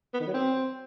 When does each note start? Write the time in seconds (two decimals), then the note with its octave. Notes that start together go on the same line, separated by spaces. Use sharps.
0.14 B3
0.21 D#3
0.27 F#3
0.34 C4